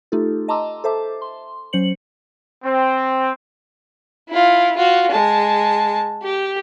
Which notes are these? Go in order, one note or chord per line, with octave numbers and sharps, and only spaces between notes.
A3 D#4 F4 G4 A4
D#5 A5 A#5 C6 D6 E6
A4 C5 E5 A5 D6
C6
F#3 C#4 C5 C#7 F#7
C4
E4 F4
F4 F#4
G#3 A5
G4